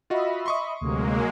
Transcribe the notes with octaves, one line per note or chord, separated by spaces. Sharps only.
F4 F#4 D#5 E5 B5
C6 C#6 D#6
D2 C3 F#3 G#3 A#3